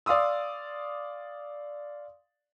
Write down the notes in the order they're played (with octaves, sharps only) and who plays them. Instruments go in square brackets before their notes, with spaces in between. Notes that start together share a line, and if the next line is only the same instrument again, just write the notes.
[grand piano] D5 F5 C6 D#6 E6